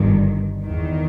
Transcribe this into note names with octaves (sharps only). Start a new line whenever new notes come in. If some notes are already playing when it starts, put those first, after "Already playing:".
Already playing: G1 G2 D#3
E2 D#3